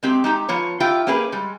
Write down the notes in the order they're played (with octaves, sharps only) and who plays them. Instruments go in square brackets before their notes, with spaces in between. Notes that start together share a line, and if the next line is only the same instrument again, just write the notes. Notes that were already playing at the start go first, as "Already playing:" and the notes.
[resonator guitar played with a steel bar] G#3 C4 G4
G#3 D#4 G4
F3 B3 F4 C#5
E4 F4 G4 G5
A#3 C#4 G4 G#4 B4
G3 G#3